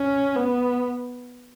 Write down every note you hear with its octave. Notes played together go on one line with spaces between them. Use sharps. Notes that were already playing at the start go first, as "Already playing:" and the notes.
Already playing: C#4
B3